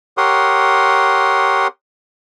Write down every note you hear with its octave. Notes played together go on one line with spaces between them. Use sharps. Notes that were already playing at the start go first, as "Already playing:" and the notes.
G4 A#4 C#5 F#5 C6 D#6